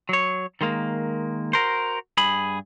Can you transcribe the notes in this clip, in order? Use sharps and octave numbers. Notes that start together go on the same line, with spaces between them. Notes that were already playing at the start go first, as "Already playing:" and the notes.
F#3 C#5
D#3 G#3 A#3
F#4 A#4 C5
G2 G#4 B5